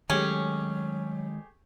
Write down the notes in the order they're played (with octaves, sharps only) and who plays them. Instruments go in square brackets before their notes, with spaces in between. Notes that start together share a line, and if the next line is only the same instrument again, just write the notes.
[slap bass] D#3 G#3 [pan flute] F#3 [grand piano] A3 G4 G#4 [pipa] C#4